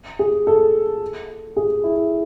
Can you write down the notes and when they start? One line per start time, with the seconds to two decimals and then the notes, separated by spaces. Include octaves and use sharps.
0.19 G#4
0.47 A4
1.56 G#4
1.84 E4